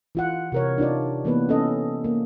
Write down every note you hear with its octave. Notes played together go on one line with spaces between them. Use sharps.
E3 F4 F#5
C3 A#4 C#5
D4 D#4 F4 D5
E3 A#3 B3 B4
C#4 A4 D#5
A#3